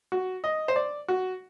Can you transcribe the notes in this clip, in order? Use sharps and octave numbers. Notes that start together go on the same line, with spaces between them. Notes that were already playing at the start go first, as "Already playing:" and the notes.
F#4
D#5
C5
D5
F#4